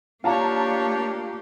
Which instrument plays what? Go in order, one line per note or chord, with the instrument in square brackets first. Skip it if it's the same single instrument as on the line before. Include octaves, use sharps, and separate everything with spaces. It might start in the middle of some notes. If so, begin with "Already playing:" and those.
[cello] A#3 G4 [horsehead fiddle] D4 C#5 [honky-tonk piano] F4 A5 A#5